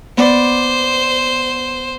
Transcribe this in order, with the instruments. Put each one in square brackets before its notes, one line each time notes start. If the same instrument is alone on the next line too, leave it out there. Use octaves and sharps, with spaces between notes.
[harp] B3 D5 [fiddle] C5